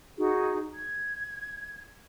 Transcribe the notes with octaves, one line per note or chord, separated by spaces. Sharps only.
D#4 F#4 G#4
G#6